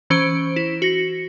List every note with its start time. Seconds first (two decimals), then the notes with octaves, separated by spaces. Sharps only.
0.10 E3 C#4 C5 C#6 D7
0.56 E4
0.82 F#4 A#6 C#7